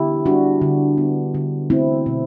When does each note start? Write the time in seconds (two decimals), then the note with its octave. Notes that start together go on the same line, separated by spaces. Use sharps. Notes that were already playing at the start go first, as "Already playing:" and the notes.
Already playing: D3 B3 E4 G4
0.26 G3 D4 F#4
0.62 D3
0.98 B3
1.34 D3
1.70 A3 C4 E4
2.06 B2